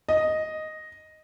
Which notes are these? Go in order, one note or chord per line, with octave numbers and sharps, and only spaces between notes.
D#5